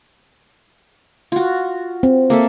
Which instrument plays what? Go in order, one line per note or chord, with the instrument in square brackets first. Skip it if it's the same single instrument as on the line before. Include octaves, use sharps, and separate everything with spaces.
[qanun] F4 F#4
[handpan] C4
[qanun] A#3 A4 E5